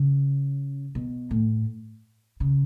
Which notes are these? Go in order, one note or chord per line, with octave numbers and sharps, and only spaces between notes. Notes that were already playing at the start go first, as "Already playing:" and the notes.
Already playing: C#3
B2
A2
C#3